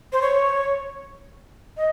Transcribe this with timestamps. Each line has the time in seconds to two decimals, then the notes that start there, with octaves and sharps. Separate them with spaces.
0.13 C5
0.22 C#5
1.77 D#5